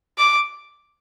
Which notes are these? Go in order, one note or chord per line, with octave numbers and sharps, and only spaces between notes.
D6